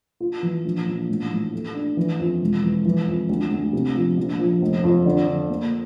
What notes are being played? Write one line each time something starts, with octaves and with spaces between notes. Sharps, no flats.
F4
E3
A#1
A#1
A1
A1
A3
D4
E3
F2
E1
E3
E3
F2
D2
D2
C3
F3
A#1
F3
F1
F2
D3
D3
A#3